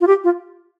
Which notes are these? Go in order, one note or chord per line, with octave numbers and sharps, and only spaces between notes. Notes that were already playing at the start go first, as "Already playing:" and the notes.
F4
G4
F4